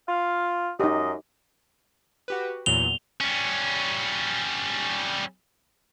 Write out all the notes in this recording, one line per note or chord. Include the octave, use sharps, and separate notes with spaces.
F4 F5
F#2 D#4 G4 D#5
F#4 G4 B4
E2 A#2 F#3 F7 G7
G3 C#4